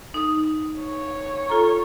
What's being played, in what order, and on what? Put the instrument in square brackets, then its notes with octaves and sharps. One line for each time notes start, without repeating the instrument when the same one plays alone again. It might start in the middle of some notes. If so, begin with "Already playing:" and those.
[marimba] D#4 D#6
[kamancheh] C#5
[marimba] F4 A4 A#5